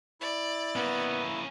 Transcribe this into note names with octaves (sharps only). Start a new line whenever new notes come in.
E4 D5
A#3 B3 C#4